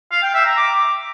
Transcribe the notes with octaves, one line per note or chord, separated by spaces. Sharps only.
F5
G5
E5
A#5
D6